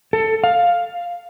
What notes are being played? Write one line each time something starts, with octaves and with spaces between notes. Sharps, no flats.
A4
F5